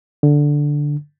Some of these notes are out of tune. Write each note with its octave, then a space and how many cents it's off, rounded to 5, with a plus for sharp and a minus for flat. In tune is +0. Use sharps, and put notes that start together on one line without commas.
D3 -5